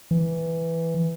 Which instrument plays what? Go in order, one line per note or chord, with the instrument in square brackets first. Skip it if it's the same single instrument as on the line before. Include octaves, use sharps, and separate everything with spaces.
[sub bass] E3